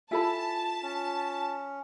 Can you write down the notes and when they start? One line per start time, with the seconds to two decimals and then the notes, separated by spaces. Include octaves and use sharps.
0.11 E4 F4 A4 G#5 A5 B5 B6
0.83 C#4